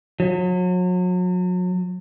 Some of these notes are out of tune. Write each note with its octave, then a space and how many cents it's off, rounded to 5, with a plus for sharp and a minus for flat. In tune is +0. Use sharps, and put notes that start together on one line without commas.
F#3 -35